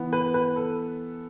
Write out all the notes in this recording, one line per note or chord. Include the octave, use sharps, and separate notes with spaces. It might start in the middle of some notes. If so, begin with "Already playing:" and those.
Already playing: E3 B3
B4
B4
A4